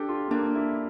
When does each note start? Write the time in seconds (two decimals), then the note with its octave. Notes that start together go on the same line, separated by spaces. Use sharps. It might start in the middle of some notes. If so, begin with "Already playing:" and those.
Already playing: D4 G4 A4
0.09 F4
0.31 A#3 D4
0.55 E4